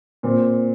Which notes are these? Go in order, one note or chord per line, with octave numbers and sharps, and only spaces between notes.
A#2 C4